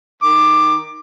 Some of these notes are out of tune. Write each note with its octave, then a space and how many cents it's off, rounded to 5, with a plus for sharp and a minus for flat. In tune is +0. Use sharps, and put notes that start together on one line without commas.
D#3 +0 D6 +15